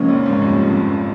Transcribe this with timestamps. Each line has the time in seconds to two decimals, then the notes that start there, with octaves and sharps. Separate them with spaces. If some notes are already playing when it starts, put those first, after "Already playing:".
Already playing: C#2 C#3 F3 A#3 C#4
0.08 A#1 A#2
0.26 G#1 G#2
0.42 G2
0.67 F2